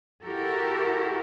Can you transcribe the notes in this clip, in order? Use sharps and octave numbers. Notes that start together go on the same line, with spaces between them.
E4 F#4 G4 A4 A#4